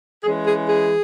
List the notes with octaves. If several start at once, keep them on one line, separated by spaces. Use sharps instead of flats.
E3 G#3 C#4 G#4
G#4
G#4